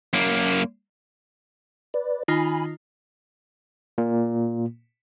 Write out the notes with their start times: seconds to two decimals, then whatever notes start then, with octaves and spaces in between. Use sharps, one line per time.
0.13 F#2 A#3
1.94 B4 D5
2.28 D#3 D#4 F4 G#5 B5
3.98 A#2 A#3